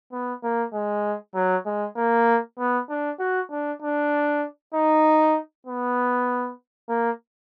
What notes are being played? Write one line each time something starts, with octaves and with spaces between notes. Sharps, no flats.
B3
A#3
G#3
F#3
G#3
A#3
B3
D4
F#4
D4
D4
D#4
B3
A#3